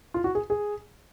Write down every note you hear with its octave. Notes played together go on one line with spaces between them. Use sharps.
F4
F#4
G#4
G#4